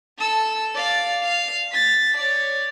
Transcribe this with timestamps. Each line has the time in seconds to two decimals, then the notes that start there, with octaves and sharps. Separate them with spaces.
0.18 A4 E6
0.75 D5 F5
1.22 F5
1.72 A6 B6
2.17 C#5 D5